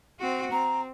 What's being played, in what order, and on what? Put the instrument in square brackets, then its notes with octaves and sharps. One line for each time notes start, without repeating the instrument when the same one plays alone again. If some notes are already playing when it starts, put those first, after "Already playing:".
[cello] C4 F#4
[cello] C4 [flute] A#5